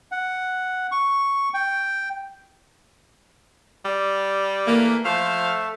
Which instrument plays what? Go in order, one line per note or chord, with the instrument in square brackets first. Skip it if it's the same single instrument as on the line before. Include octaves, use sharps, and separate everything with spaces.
[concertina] F#5
C#6
G5
[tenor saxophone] G3
[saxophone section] E3 A3 A#3
[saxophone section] F3 C5 F5 [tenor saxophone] A3